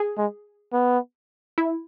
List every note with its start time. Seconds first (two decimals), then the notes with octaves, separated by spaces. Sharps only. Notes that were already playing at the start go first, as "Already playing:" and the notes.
Already playing: G#4
0.17 G#3
0.73 B3
1.58 E4